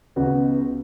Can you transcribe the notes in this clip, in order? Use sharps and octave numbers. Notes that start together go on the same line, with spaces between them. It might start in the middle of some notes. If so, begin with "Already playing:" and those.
C#2 C#3 B3 F#4